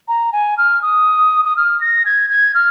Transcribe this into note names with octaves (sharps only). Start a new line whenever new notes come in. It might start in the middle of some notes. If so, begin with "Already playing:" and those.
A#5
G#5
F6
D#6
D#6
F6
A#6
G#6
G#6
F6